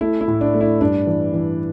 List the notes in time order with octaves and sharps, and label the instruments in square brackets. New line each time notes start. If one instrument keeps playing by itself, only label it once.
[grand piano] A3 E4
E4
A2
D4
A3
E4
G2 D4
E3
E3